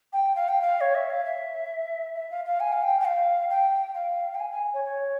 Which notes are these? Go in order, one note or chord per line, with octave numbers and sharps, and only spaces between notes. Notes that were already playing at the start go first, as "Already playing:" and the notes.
G5
F5
G5
F5
C#5
E5
F5
E5
E5
F5
F5
G#5
F5
G5
G5
F5
G5
F5
G5
G#5
G#5
C#5
C#5